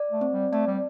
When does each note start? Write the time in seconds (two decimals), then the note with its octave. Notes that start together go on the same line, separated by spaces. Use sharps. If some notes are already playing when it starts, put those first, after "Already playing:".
Already playing: D5
0.11 A3
0.21 C4
0.32 G3
0.52 A3 D5
0.67 G3